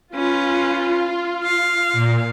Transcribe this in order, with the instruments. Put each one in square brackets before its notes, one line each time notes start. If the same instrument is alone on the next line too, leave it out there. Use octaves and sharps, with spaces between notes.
[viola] C#4 B4 [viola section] F4
[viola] F5
[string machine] A#2